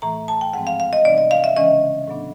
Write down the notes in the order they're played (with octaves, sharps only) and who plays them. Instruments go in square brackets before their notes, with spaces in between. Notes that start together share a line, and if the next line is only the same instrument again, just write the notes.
[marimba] A2 E3 A3 A#5
A5
G5
G#2 F3 G#3 C4 F#5
F5
F5
D#5
C3 E3 G3 B3 D4 D5
D#5
F5
E5
C#3 E3 G#3 C#4 D#5
A2 F#3 B3 D4